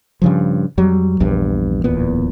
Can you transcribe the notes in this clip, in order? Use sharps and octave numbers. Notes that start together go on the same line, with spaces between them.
G2 C#3 F3
F2 F#3 G3
A#1 E2 G2
D1 E2 A#2 B3